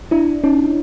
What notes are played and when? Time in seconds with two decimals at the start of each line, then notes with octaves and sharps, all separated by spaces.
0.11 D4 E4
0.44 C#4 D#4